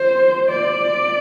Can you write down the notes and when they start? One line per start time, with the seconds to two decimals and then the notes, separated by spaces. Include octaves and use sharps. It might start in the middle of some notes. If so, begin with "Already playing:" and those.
Already playing: C5
0.49 D5